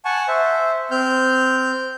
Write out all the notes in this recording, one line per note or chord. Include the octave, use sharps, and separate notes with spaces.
F#5 G#5 A5 C#6
C5 E5
C4 F6 G6